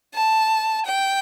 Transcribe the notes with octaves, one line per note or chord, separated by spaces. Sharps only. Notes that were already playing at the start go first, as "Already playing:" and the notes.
A5
G5